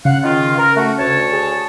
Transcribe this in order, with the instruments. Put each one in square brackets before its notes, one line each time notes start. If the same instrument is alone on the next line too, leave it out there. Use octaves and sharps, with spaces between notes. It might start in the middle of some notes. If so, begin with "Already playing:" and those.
[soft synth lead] C#3 [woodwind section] F5 F#5
[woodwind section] D#3 F4
[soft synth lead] C#3 [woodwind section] A#4
[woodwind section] A3 F#4
D2 C#5 A5
[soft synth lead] G#4